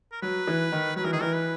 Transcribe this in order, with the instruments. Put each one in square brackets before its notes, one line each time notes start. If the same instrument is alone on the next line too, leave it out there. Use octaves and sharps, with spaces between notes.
[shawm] A#4
[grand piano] F#3 [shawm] B4
[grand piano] E3
D#3
[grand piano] F#3 [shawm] B4
[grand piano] E3 [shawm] A#4
[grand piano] D#3 [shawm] G#4
[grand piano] E3 [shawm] A#4
[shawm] B4